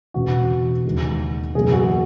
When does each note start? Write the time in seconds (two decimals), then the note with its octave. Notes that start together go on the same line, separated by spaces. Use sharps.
0.14 E1 E2 C#3 F#4
0.84 D#2 D#3 G#3
1.55 F#1 E2 B2 F#3 A#3 G#4
1.72 F#4
1.90 G#4